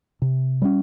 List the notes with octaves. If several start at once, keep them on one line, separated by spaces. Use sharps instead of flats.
C3
G3 A#3 C#4